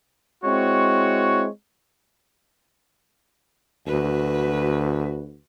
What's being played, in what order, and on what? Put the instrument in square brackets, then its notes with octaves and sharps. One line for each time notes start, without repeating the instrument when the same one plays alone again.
[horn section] G#3 C4 E4 F#4 C#5
[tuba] D2 [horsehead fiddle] F#4 B4